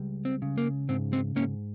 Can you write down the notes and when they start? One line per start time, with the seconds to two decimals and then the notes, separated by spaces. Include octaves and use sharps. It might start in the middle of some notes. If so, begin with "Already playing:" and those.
Already playing: C#2 G3
0.25 C4
0.42 C#3
0.58 A#3
0.89 G#2 C4
1.13 C4
1.36 G#2 A#3 C#4